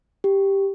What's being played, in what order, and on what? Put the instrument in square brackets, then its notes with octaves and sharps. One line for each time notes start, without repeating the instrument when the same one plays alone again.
[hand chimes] G4